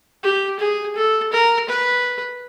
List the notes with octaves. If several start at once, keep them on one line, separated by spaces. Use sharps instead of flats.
G4
G#4
A4
A#4
B4